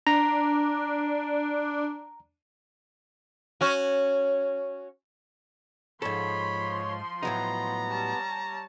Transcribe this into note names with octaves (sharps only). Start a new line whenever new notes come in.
D4 A#5
C#4 F#4
G#2 F3 A4 C#5 B5 C6
A2 F#3 B3 D#4 A#5
G3 C#5 A5